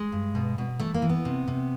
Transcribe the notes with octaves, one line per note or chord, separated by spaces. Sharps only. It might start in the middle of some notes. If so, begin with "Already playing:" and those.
Already playing: G#3
G2
B2
B2
E3 A3
A#3
E3
B3
C3
C3